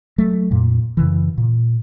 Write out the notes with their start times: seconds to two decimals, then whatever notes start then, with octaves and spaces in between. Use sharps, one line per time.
0.18 F#3 A3
0.51 F2 A#2
0.97 F#2 C#3 E3
1.38 A#2